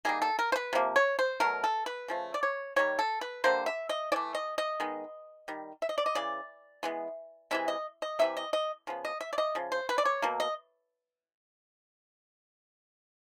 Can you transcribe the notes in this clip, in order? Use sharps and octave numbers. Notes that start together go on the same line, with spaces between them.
D#3 G3 A#3 G#4
A4
A#4
C5
B4
C3 F3 A#3
C#5
C5
B2 F#3 A3 A#4
A4
B4
C#3 F3 A3
D5
C#5
D#3 G3 A#3 C#5
A4
B4
D3 G3 A#3 C5
E5
D#5
E3 A3 D5
D#5
D#5
D#3 G#3 B3
D#3 G3
E5
D#5
D5
D#5
C#3 E3 D5
E3 G#3 B3
C3 E3 G#3 E5
D#5
D#5
C3 E3 G3 E5
D#5
D#5
C#3 F3 B3
D#5
E5
D5
D#5
C#3 F3
C5
B4
D5
C#5
B2 F#3 A#3
D#5